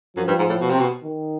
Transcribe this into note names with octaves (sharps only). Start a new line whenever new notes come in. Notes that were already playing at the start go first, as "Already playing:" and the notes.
F#2 F3
G2
G#2
A2
B2
C3
B2
D#3